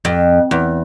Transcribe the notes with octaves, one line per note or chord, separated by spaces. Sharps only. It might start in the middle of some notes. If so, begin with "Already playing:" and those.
F2
E2